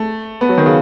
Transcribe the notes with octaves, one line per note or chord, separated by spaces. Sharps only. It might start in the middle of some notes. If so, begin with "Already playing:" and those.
Already playing: A3
B3
F#3
D#3
C#3